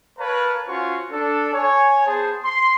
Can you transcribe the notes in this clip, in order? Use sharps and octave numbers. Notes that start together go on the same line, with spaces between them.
A#4 B4 C#5 F5 A5 A#5
C#4 F4 F#4 C5 C#6
D4 A4
C#5 G#5
B3 G#4 C5 A5
C6